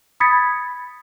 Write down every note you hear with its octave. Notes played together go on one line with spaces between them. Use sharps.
B5 D#6 G#6 A6 B6 C#7